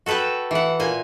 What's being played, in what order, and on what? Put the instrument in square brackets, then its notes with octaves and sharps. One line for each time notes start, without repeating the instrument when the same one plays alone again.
[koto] F#4 A4 B4 G5 A5
E3 F#5
A#2 G#5